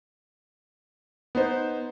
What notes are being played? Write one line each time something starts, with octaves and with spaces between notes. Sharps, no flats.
B3 D#4 C5